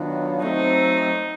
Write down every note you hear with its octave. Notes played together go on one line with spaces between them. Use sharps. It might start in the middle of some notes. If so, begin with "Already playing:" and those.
Already playing: D#3 F#3 B3 D4 F4
F#3 A3 C4 D#4